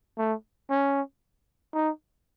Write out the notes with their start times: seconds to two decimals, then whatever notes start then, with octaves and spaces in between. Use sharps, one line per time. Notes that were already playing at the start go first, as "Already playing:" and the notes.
0.18 A3
0.70 C#4
1.74 D#4